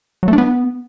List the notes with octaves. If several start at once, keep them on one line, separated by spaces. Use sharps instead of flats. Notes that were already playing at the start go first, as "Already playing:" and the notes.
F#3
A3
D4
B3